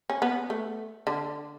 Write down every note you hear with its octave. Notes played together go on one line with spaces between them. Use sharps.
C#4
B3
A3
D3